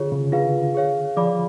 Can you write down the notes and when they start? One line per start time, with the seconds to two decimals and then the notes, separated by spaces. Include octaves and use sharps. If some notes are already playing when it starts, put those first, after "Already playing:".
Already playing: D3 F4 G#4 C#5
0.12 C#3
0.32 D3 F4 G#4 B4 F5
0.75 G#4 C#5 F5
1.16 F3 G#4 D5 F5 B5 D6